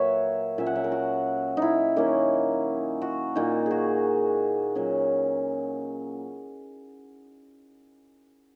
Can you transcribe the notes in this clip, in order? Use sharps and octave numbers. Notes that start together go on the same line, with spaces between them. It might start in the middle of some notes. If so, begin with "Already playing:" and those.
Already playing: A#2 F#3 A#3 B4 C#5 E5
A#2 F#3 C#4 E5
F#5
E5
A#4
F#4
D#4 E4
D#3 A#3 C#4
F#4
A#2 A#3 D#4
F#4 G#4
A#2 F#3 C#4